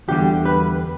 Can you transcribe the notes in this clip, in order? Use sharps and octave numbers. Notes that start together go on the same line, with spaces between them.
E2 D3 G3 G4
B4